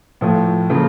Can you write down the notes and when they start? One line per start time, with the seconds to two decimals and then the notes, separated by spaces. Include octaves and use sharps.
0.21 A2 F3 A3
0.70 C#3 F3 A#3